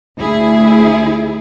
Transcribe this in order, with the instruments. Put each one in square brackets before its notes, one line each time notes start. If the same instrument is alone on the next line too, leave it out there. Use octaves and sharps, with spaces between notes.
[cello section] D2 E4 G#4